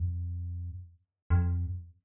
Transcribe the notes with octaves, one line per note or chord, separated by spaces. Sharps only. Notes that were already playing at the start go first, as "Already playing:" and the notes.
Already playing: F2
F2